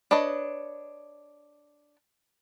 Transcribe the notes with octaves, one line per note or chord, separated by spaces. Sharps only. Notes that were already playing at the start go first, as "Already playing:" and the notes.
D4 B4 C#5 D#5